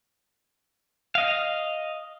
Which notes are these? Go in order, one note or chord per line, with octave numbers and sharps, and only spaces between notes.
D#5 F5